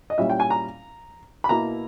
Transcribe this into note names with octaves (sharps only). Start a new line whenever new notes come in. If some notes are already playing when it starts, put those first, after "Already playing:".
D#5
A#2 G3 C#4 E4 E5
G5
G#5
A#5
B5
B2 A#3 E4 A#5